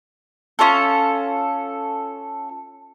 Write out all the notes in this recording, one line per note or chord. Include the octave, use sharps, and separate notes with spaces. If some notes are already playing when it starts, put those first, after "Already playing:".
C#4 F4 A4